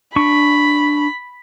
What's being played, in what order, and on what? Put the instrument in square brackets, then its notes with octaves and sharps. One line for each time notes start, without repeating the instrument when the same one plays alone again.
[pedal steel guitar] D4 C#6 [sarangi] B5